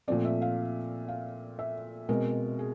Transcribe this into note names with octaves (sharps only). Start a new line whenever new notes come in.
A#2 F3 A3 C4 D5
E5
F5
F5
E5
B2 G#3 C4 A#4
G#4